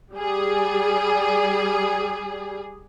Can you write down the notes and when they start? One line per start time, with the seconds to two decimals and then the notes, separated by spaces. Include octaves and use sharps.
0.14 G3 G#4